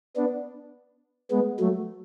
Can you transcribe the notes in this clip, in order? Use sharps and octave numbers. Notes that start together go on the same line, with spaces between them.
B3 D4
G#3 B3
F#3 A3